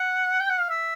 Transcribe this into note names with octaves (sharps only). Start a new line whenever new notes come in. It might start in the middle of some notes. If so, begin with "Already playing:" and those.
Already playing: F#5
G5
F#5
F5
E5